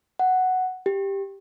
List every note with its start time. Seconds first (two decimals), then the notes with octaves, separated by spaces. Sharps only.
0.19 F#5
0.86 G4